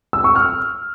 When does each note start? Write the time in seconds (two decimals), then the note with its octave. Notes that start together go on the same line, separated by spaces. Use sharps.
0.13 E6
0.24 C#6
0.35 F6